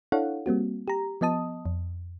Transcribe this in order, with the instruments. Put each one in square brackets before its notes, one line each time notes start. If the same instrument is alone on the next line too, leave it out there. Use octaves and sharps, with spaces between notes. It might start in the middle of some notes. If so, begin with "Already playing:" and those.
[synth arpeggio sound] D4 E4 A4 C#5 F5 F#5
G3 A#3 C4 F#4
G4 A#5
F3 B3 D#5 A5 D#6
F2